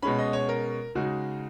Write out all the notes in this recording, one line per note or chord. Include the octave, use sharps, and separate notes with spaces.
B2 G#3 C#4 B5
D#5
C#5
A#4
C#3 G#3 D#4 F#4